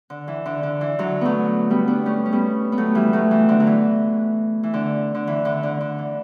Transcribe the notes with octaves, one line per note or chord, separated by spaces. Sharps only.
D3
E3
D3
D3
E3
D3 F#3
F#3 A3 B3
G3 B3
B3 D4
A3 C#4
C#4
G3 B3
B3
F#3 A3
E3 G3
F#3 A3
E3
D3 F#3
F#3
E3
E3
D3
D3
E3
D3
D3
D3
E3